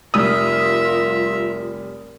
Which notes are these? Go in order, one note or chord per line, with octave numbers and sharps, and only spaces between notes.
F1 G3 F4 A#4 E5 D#6 F6